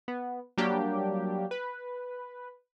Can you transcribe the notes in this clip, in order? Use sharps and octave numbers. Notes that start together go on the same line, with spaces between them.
B3
F#3 G3 A#3 D4 G4
B4